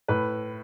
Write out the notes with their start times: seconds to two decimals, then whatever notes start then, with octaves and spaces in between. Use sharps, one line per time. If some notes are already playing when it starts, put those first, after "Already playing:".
0.08 A2 B4